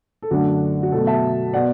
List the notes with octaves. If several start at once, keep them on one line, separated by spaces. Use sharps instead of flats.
A4
F#2 D3 A3 D4 F#4
F#4
B2 F#3 A3 A4
E5 A5
B2 B3 D5 F#5